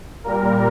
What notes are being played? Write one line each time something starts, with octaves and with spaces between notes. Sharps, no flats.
A#2 G3 A#4